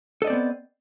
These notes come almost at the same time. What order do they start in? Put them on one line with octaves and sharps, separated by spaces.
A4 D#5 D5 C4 B3